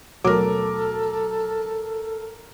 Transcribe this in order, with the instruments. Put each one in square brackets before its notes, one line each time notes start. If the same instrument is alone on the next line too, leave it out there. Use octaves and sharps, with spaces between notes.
[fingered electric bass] D#2 B2 A3 [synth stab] F#3 [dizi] A4 [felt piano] A#4 D6